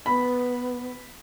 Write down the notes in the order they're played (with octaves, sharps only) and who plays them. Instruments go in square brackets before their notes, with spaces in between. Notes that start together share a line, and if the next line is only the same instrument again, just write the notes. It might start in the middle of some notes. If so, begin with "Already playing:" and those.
[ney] B3 [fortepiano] B5